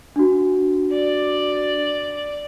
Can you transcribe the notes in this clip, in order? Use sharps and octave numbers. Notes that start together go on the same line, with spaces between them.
D4 F#4
D5